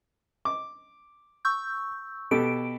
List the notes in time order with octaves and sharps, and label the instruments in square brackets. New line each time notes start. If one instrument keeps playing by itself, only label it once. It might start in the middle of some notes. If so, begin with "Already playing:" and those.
[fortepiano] D6
[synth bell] C#6 E6 G6
[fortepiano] B2 G4 A4 [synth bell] D7